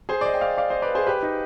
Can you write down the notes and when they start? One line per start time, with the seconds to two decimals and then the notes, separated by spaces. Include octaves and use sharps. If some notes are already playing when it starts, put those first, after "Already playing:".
0.09 G#4 C5
0.21 D5
0.26 C5 D#5
0.34 G5
0.41 D5 F5
0.57 D5 F5
0.70 C5 D#5
0.82 B4 D5
0.95 G#4 C5
1.07 G4 B4
1.23 D#4